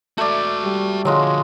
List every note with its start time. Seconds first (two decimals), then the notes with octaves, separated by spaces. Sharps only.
0.18 A3 F#4 D5 E5
0.64 G3
1.05 D3 F3 F#3 G#3 F4